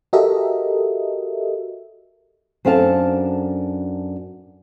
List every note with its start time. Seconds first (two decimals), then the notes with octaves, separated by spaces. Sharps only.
0.13 F#4 G4 A4 A#4 D#5 E5
2.65 F#2 C4 D4 A4 F5 A5